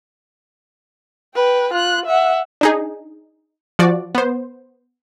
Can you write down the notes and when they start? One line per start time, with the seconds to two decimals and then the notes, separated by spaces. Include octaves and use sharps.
1.35 B4 G5
1.73 F4 F#6
2.06 E5 F#5
2.61 D4 D#4 G#4
3.79 F3 F#4 D5
4.15 B3 C5